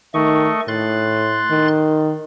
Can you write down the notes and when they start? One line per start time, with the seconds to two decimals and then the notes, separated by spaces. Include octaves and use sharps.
0.14 D#3 A3 D#5 C#6
0.68 A2 C6 F#6 A6
1.51 D#3